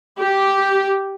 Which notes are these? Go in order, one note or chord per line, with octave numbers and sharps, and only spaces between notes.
G4